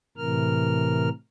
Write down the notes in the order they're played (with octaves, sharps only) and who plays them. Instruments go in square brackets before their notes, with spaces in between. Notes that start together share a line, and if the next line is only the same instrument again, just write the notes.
[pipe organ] A2 C3 E3 A#4 F6